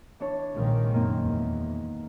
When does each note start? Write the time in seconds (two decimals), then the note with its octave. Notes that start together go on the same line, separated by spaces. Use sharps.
0.20 E3 D4 C#5
0.55 A#1 C3 D#3 G#3 F4 A#4
0.94 F#2 D#3 A#3 C4
1.27 E2